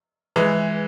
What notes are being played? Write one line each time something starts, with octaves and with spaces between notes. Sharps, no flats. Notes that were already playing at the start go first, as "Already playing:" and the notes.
E3 G#3